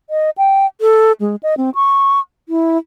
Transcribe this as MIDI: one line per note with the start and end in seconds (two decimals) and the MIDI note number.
0.10 0.30 75
0.38 0.66 79
0.81 1.12 69
1.21 1.36 56
1.43 1.55 75
1.57 1.70 60
1.75 2.19 85
2.49 2.78 64